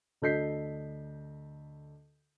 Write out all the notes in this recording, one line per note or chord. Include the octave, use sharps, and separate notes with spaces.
D2 A4 D#5 G6 B6 C7